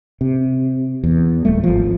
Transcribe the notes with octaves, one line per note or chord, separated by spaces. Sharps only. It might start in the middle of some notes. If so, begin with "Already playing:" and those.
C3
E2
D1 G3 A3
G#1 F3